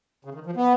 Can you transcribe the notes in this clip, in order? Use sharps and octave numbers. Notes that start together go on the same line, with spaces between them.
C#3
D#3
F3
B3